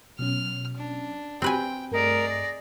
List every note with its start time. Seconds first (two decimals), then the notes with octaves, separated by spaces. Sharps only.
0.19 B2 F#3 C#4 F6
0.77 D4
1.42 C4 F#4 G4 B4 G5 G#5
1.92 G2 A3 G#4 A#4 D5 D#5
2.29 A#6